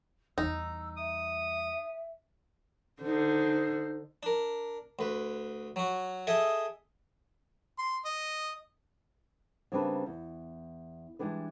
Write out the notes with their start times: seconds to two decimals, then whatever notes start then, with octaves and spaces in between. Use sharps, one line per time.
0.38 E2 G3 D#4 E6
0.97 E5 D#6
3.02 D3 D#4 C5
4.23 D4 A#4
4.99 D2 B4
5.76 F#3 F#4
6.27 G#4 A4 D#5 E5 G5
7.78 C6
8.05 D#5
9.72 C#3 G3 A#3 C4 D4 B4
10.06 E2
11.19 E3 F3 G3 G#3 D4 B4